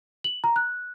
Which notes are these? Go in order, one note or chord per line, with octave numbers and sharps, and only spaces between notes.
F#7
A#5
F#6